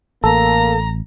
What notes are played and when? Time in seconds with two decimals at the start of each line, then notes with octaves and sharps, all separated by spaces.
0.24 A1 A#3 A4 A#5